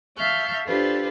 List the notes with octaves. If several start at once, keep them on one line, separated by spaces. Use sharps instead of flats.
E5 F5 A5 C#6 F6 G6
D4 F4 G4 A4 B4 C5